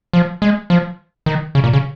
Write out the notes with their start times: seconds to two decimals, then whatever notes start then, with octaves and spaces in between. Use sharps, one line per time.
0.13 F3
0.42 G#3
0.70 F3
1.26 D#3
1.55 C#3
1.64 A#2
1.73 C#3